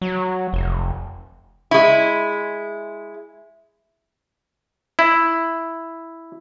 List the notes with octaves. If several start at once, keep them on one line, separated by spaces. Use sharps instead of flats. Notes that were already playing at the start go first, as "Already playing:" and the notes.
F#3
F1
G#3 E4
E4